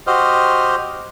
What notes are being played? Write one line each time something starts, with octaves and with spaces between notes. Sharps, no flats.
F#4 G4 C5 D#5 F6